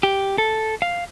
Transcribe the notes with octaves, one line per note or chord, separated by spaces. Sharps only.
G4
A4
F5